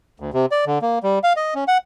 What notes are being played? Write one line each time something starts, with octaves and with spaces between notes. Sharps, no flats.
D2
C3
D5
D3
A#3
G3
F5
D#5
C#4
F#5